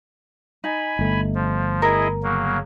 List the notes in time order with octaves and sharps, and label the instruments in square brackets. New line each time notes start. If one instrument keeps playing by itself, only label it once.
[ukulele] D#4 [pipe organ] G#5 B5
[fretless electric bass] G1 A3
[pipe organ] F3
[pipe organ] E4 G#4 D#5 [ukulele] A#4
[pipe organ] C#3 F#3 A#3